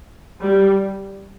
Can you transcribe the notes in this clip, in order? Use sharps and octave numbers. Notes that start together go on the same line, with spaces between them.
G3